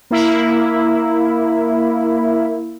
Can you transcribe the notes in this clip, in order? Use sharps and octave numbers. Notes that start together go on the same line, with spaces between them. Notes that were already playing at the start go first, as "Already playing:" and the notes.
A#3 E4